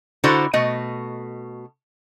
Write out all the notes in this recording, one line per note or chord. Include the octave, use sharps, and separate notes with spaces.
D3 E4 F#4 C5 D5 A#5
B2 A3 D#5